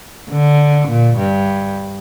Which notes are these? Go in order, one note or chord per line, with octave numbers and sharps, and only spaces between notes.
D3
A#2
G2